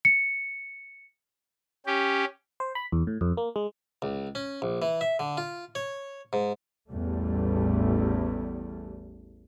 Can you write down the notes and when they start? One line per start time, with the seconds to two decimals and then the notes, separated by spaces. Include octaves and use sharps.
0.05 C#7
1.86 C#4 G4
2.60 C5
2.75 B5
2.92 E2
3.07 A2
3.21 F2
3.37 A#3
3.56 G#3
4.02 C#2
4.35 C#4
4.62 A#1
4.82 E3
5.01 E5
5.19 D3
5.37 F4
5.75 C#5
6.33 G#2
6.90 A1 E2 G3 A3